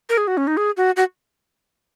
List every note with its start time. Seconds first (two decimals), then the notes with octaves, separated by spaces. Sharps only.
0.09 A#4
0.17 G#4
0.27 F#4
0.37 C#4
0.47 D#4
0.57 G#4
0.77 F#4
0.97 F#4